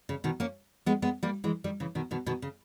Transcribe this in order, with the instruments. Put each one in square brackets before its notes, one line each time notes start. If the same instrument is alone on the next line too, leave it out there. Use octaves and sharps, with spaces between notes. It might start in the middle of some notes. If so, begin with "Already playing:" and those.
[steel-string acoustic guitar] C#3
B2 D#3
A#3 C#4
G#3 B3
G#3 B3
G3 A#3
E3 G#3
D#3 G3
C#3 E3
B2 D#3
B2 D#3
B2 D#3
C#3